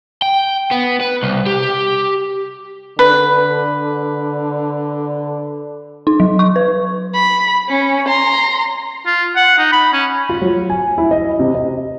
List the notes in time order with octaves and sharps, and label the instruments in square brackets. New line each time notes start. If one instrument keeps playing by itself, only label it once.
[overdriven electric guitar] G5
B3
B4
C2
G4
[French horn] D3 [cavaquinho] B4
[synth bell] D#4
F#3
C#6
B4
[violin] B5
C#4
A#5 C6
[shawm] F4
F#5
D#4
B5
C#4
[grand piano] F4
F#3
G#5
E4
D#5
C3
D#5